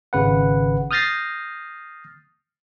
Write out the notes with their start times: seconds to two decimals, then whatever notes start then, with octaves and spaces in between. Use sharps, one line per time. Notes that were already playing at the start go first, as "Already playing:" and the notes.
0.13 G#1 C#3 B4 F#5
0.91 D#6 F6 G6 A6 A#6 C7